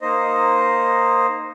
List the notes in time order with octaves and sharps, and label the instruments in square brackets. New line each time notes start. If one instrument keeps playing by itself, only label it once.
[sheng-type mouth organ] A#3 D#4 C5 D#5